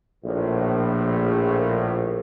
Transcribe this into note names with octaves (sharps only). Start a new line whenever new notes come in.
A#1 A2